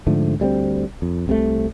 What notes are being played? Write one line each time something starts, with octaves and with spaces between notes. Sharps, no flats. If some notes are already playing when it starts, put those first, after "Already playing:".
G#2 D3 F3 A3
D2 G3 A3 C4
F2
C2 C3 D#3 A3